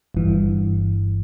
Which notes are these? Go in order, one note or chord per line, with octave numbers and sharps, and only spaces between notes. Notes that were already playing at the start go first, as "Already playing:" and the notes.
G1 G2 E3